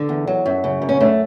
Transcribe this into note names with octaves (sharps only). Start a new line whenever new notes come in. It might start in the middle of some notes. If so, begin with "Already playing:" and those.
Already playing: D3
E2
F#3
F#2
C#3
F#2
C#4
A3 D4